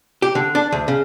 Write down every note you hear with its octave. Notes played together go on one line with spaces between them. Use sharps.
G4
D3
D4
D2
C#3